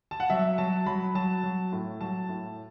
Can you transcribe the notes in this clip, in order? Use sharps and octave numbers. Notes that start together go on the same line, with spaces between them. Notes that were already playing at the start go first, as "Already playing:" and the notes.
A5
F#5
F#3 E5
F#3 A5
F#3 B5
F#3 A5
F#3
A2
F#3 A5
A2